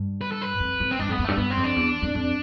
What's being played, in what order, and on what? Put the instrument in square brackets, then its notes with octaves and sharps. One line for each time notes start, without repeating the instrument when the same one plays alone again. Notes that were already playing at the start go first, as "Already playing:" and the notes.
Already playing: [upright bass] G2
[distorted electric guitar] B4
A4
B4
[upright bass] F2
F2
[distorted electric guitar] C4
[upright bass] G2 [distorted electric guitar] D4
[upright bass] F2
[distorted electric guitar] B3
[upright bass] F2
[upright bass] G2 [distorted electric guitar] A3
[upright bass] G2 [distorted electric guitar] B3
[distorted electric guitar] C4
[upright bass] F2
[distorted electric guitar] D4
[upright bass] E2
F2
F2